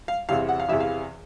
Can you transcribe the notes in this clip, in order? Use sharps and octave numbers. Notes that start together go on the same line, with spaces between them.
F5
E2 C3 E3 F5
F#5
F5
E2 C3 E3 E5
F5